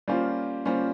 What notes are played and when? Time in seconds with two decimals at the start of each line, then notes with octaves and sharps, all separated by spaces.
0.08 G3 A#3 C#4 F4 C5
0.65 G3 A#3 C#4 F4 C5